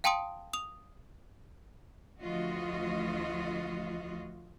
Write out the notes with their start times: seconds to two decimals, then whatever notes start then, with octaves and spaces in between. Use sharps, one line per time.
0.04 F5 G5 A5 C6 D#6 D7
0.53 D#6 F7
2.21 D2 E3 F3 F4 F#4 D#5